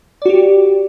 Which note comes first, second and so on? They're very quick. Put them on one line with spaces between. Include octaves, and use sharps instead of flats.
D5 F#4 G4